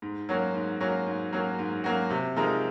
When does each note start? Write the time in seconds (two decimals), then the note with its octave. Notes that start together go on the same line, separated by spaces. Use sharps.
0.02 G#2
0.29 F#3 A#3 C#4 F#4
0.54 G#2
0.80 F#3 A#3 C#4 F#4
1.06 G#2
1.33 F#3 A#3 C#4 F#4
1.59 G#2
1.84 F#3 A#3 C#4 F#4
2.10 C3
2.36 F3 G#3 D#4 A#4